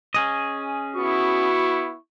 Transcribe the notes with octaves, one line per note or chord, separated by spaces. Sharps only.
C#4 G#4 D#5
B3 E4 F#4 C#6